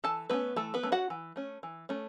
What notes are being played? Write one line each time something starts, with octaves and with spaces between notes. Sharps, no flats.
E3 A4 A5
A3 B3 C#4 B4
E3 A3 A4
B3 B4
A3 C#4
F#4 F#5
E3
A3 C#4
E3
A3 C#4